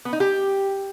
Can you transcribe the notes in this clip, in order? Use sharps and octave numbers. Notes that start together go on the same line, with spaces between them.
B3
D#4
G4